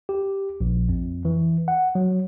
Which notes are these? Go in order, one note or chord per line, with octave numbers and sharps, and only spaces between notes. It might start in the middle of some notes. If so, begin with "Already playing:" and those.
G4
A#1
F2
E3
F#5
F#3